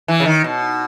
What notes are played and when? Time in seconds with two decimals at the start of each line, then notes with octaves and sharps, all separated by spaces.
0.08 E3
0.20 C#3
0.26 D#3
0.44 B2